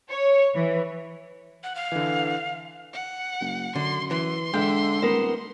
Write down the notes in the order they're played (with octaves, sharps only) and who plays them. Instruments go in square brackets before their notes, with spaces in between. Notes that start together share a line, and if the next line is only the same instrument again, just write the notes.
[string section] C#5
E3
[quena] F#5
F5
[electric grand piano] D3 E3
[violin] F#5
[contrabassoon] F#1
[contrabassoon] F#2 [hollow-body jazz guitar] D3 [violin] C6
[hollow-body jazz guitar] E3 [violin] C6
[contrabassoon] D3 [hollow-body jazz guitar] G#3 [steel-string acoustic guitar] E5 F5 G5
[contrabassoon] D#1 [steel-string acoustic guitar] B3 A#4 C5